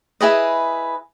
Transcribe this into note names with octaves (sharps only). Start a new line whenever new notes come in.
E4 G#4 B4 D#5